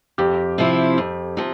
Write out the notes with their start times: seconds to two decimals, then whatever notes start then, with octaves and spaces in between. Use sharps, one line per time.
0.18 F2 G4
0.58 C3 F3 C4 E4
0.98 F2
1.37 C3 F3